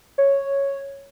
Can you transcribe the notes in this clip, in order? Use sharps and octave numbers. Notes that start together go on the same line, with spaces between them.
C#5